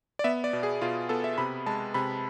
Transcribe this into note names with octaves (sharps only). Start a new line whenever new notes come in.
D5
B3 E5
D5
B2
G#4
B2 F4
B3 A4
E5
C3 B5
G#3 A5
C3 B5